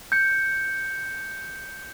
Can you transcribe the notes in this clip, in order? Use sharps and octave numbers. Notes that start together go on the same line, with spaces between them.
G6 C#7